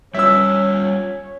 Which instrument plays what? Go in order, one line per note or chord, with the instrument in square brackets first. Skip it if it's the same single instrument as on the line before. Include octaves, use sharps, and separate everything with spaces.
[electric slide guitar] G3 F4 [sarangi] C#4 [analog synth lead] C#5 [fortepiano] E5 E6